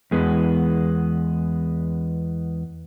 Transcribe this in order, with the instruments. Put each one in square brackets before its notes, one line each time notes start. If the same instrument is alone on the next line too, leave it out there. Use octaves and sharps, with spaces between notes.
[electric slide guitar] E2 G#3 B3